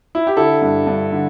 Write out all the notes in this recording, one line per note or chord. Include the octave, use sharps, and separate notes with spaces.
E4
G4
D3 E4 A4
G2
G2
D3